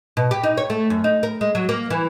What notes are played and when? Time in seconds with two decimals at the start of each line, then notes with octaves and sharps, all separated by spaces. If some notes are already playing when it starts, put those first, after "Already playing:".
0.17 B2
0.31 G4
0.44 D#4
0.57 C#5
0.70 A3
0.90 F#2
1.04 D#4
1.23 A#4
1.41 G#3
1.55 F#3
1.69 A#3
1.90 E3